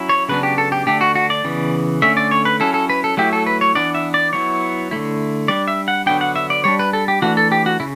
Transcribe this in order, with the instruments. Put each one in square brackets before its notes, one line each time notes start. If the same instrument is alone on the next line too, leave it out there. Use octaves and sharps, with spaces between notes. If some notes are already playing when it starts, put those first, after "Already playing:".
Already playing: [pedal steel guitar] F#3 C#4 E4
C#5
C#3 F#3 B3 D4 B4
G4
A4
G4
D3 A3 D4 G4
F#4
F#4
D5
C#3 E3 B3
D3 A3 C#4 E5
D5
C#5
B4
F#3 C#4 E4 A4
A4
B4
A4
F#3 A3 E4 G4
A4
B4
C#5
E3 B3 D4 D5
E5
D5
F#3 B3 E4 C#5
D3 A3 E4
G3 D4 D5
E5
F#5
D3 F#3 B3 D4 G5
F#5
E5
D5
G3 D4 C#5
B4
A4
G4
E3 A3 D4 F#4
A4
G4
F#4
C#3 E4